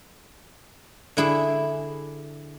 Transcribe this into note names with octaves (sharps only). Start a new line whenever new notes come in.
D3 E4 G#4